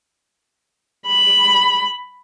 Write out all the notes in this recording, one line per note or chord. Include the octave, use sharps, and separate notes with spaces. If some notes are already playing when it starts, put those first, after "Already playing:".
B5